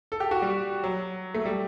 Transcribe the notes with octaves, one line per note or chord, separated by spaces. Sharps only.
A4
G4
F#4
G3
F#3
A3
G3